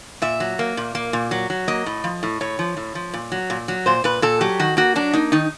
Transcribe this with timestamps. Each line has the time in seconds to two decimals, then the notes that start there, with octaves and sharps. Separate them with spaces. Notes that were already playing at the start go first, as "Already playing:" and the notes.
0.22 A#2 E5
0.40 F#3
0.59 A#3
0.77 A#2
0.95 A#3
1.13 A#2
1.31 F#3
1.50 F#3
1.68 A#3 D#5
1.86 A2
2.04 F3
2.23 A2
2.41 A2 C#5
2.59 F3
2.77 A2
2.95 F3
3.14 A#2
3.32 F#3
3.50 A#2
3.68 F#3
3.86 A#2 C5
4.04 A#2 B4
4.22 A#2 A4
4.41 F#3 G4
4.59 D#3 F#4
4.77 A#3 F#4
4.95 F#3 D4
5.13 A#3 D#4
5.32 D#3 D#4